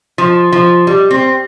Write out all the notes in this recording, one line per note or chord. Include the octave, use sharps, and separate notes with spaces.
F3
F3
G3
C4